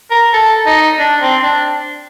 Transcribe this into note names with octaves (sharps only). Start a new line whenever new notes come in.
A#4
A4
D#4
D4
C4
D4